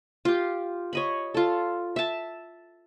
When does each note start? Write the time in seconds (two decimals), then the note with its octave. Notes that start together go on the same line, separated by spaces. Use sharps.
0.25 F4 G4
0.93 C#5 D#5 B5
1.34 F4 A4
1.96 E5 A5